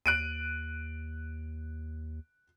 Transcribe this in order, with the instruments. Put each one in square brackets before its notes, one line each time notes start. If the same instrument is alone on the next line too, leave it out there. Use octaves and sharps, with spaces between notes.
[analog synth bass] D#2 [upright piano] F#6 D7 D#7